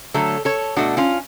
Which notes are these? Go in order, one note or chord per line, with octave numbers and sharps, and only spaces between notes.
D3 F#3 A3 A4 C#5
A4 C#5
B2 A3 D4 F#4
C#4 F4